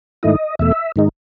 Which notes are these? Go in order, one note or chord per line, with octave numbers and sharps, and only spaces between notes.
G#2 D#3 A3 E4 D#5
E2 B2 A3 E5
G#2 D#3 G#3 D#4